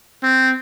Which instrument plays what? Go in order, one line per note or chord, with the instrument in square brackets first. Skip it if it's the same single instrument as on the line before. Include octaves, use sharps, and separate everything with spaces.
[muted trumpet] C4